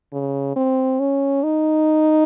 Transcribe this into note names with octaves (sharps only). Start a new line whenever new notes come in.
C#3
C4
C#4
D#4